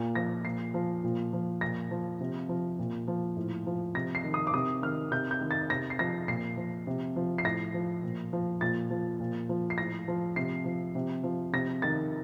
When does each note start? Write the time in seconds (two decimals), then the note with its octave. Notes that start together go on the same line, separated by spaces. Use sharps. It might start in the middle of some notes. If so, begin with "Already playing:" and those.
Already playing: A#2
0.15 F3 A#6
0.45 A#2 C7
0.74 F3
1.04 A#2
1.33 F3
1.61 A#2 A#6
1.91 F3
2.21 C3
2.49 F3
2.79 A#2
3.08 F3
3.37 A2
3.67 F3
3.95 C3 A#6
4.15 C7
4.24 D#3
4.34 D#6
4.47 D6
4.53 C3 D#6
4.82 D#3 F6
5.11 C3 G6
5.31 G6
5.41 D#3
5.51 A6
5.70 C3 A#6
5.90 C7
5.99 F3 A#6
6.28 A#2 C7
6.57 F3
6.87 C3
7.16 F3
7.38 C7
7.45 A2 A#6
7.74 F3
8.03 A#2
8.33 F3
8.61 A#2 A6
8.91 F3
9.20 A#2
9.49 F3
9.70 C7
9.78 A2 A#6
10.08 F3
10.36 C3 C7
10.65 F3
10.95 C3
11.23 F3
11.53 C3 A#6
11.82 D#3 A6